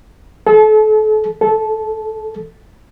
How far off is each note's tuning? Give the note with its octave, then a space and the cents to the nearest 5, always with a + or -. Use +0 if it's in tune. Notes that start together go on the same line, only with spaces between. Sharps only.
A4 -35
A4 -15